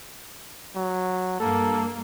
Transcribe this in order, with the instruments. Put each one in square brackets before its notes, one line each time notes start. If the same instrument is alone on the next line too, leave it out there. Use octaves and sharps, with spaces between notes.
[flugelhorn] F#3
[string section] G2 A#3 [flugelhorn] A4